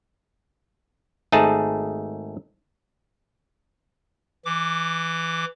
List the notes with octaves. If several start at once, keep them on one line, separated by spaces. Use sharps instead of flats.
G#1 A3 D#4 G#4 A5
E3 D6